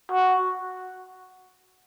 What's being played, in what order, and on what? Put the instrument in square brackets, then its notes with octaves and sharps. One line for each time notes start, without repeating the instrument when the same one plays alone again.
[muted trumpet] F#4